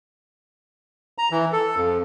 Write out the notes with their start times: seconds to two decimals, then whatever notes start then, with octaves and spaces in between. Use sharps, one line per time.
1.18 A#5
1.31 E3
1.53 A4
1.76 F2